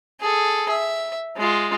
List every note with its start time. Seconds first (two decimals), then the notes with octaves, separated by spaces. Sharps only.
0.21 G#4 A4
0.69 E5
1.37 G#3 F4